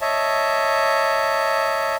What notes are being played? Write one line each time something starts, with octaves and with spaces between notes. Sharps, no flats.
C#5 D#5 E5 A5